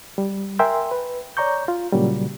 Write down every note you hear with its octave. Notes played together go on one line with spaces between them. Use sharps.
G3
A#4 E5 G5 G#5 C6
B4
C#5 D5 A#5 C#6 G6
F4
A#2 C#3 F#3 G3